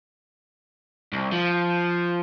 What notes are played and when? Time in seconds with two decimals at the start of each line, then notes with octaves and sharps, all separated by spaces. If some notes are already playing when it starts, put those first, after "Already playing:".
1.13 C2
1.32 F3